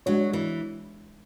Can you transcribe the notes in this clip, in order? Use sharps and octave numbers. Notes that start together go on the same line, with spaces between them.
F#3 G#3 D4 F#4 C#5
E3